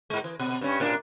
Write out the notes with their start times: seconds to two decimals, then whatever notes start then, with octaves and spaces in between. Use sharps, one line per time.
0.10 G#2 G#3
0.24 E3
0.39 B2
0.61 G2 C#4
0.80 A2 A#3 D4